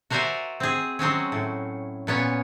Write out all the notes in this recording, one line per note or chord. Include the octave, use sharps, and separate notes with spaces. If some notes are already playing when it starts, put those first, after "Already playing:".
F#4 A#4 C5 D5 E5 G#5
C4 G#4
F#3 G#3 C4 C#4
A2
A#2 B3 C#4 C#5